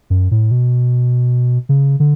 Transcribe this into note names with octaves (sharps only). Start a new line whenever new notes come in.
F#2
A2
B2
C#3
D3